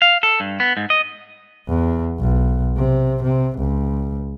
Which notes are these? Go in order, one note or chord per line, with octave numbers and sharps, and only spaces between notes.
F5
A4
G2
B3
G#2
D#5
E2
B1
C3
C3
C#2